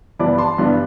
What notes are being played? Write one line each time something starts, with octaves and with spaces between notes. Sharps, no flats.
G2 E3 B3 D4 B5 D6
A5 C6
G2 E3 B3 D4